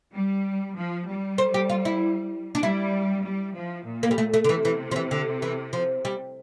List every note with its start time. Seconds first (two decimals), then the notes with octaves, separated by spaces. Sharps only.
0.14 G3
0.76 F3
1.08 G3
1.38 C5
1.54 G4
1.70 F4
1.85 E4
2.55 D4
2.63 G3 E4
3.25 G3
3.57 F3
3.87 A#2
4.03 A#3
4.11 G3
4.18 A3
4.34 A3
4.44 D3
4.49 C3 E3
4.65 E3
4.91 F3
4.96 E3
5.11 D3
5.42 E3
5.73 F3
6.05 G3